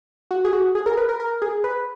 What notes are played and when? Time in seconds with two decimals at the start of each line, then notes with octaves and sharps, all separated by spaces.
0.31 F#4
0.45 G#4
0.53 F#4
0.75 G#4
0.86 A#4
0.97 B4
1.09 A#4
1.20 A#4
1.42 G#4
1.64 B4